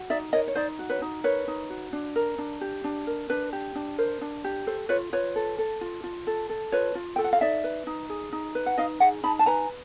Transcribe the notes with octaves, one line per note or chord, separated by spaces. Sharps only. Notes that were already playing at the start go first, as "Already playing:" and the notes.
Already playing: F#4
D#4 D5 E5
A#4 C#5 D#5
C#5
D#4 C5 D5
F#4
B4 C#5
D#4
A#4 B4 C#5
D#4
F#4
D4
A#4
D4
G4
D4
A#4
D4 B4
G4
D4
A#4 C5
D4
G4
A4 C5
F4 B4 C#5
F4 B4 C#5
A4
A4
F4
F4
A4
A4
F4 B4 C#5
F4
A4 G5
F#5
F5
D#4 D5 E5
B4
D#4
G#4
D#4
B4
F#5
D#4 D#5 F5
G#4 E5 F#5
D#4 A5 B5
A5
B4 G#5 A#5